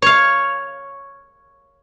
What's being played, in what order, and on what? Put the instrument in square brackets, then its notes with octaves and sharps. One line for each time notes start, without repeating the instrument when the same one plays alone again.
[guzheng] C#5 F5